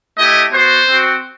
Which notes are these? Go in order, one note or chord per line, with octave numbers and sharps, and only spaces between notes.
A3 E4 G4 D#5
B3 F#4 C5
C4 F#4